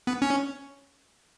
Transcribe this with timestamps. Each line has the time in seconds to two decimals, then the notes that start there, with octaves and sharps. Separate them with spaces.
0.07 B3
0.22 C#4